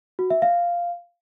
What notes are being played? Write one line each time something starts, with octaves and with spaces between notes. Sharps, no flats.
F#4
E5
F5